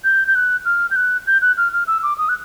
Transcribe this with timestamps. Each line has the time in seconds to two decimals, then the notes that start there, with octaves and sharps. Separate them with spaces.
0.04 G6
0.28 G6
0.35 F#6
0.65 F6
0.91 G6
0.96 F#6
1.27 G6
1.42 F#6
1.58 F6
1.73 F6
1.87 E6
2.03 D6
2.18 D#6
2.29 F#6